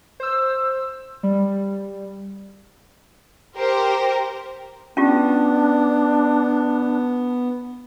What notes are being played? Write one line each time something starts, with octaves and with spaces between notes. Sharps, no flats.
C5 E6
G3
G4 A#4 C5
B3 C#4 D4 F4 G4